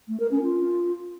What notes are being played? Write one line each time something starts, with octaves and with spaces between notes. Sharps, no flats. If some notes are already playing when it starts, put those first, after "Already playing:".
A3
A#4
C#4
F4